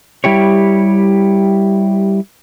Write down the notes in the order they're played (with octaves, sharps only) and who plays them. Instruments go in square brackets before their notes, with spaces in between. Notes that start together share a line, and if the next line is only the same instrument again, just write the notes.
[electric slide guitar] G3 E4 G4 C#5